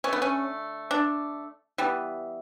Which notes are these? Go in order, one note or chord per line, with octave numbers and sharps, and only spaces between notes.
D3 A3 C#4
B3
C#4
D4
E3 G3 B3